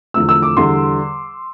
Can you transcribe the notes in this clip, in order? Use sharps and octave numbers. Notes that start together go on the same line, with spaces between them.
E2 D3 F3 A3 E6
E6
D6
E2 D3 G3 C6